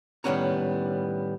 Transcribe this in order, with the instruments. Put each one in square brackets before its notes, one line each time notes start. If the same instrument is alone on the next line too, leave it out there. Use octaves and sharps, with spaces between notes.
[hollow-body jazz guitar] A2 D#3 G3 B3 C#4 A#5